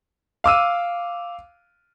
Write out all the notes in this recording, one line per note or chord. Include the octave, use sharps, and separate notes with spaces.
F5 D6 E6 D#7